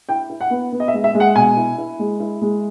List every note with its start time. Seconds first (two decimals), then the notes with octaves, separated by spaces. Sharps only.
0.09 E4 G5
0.30 E4
0.41 F#5
0.50 B3
0.72 B3
0.80 D#5
0.88 E5
0.94 G#3
1.04 E5
1.15 G#3
1.20 F#5
1.35 B2 G#5
1.57 E4
1.78 E4
1.99 G#3
2.20 E4
2.42 G#3